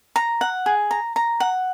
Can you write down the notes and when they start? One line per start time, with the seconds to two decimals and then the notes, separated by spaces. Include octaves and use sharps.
0.16 A#5
0.41 F#5
0.66 G#4
0.91 A#5
1.16 A#5
1.40 F#5